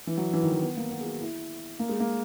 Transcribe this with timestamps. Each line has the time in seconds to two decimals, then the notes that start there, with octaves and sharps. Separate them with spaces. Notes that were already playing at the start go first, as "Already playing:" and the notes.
0.07 E3
0.17 F#3
0.33 E3
0.43 D#3
0.52 E3
0.61 B3
0.77 A#3
0.91 B3
1.00 G#4
1.06 F#4
1.20 E4
1.79 A#3
1.89 G#3
2.00 A#3